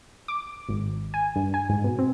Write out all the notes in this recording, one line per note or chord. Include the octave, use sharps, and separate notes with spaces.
D6
G#1
G#5
G2
G#5
G#2
B2
C4